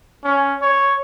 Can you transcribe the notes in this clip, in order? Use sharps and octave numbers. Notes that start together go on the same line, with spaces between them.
C#4
C#5